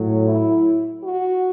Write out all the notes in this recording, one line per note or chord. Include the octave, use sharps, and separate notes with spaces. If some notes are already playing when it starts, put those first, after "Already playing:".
Already playing: A2 F#3
E4
F#4